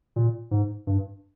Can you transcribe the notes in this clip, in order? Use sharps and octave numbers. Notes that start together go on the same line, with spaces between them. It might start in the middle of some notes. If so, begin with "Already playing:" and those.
A#2
G#2
G2